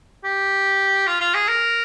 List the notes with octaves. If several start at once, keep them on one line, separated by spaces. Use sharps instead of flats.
G4
F4
F4
G#4
A#4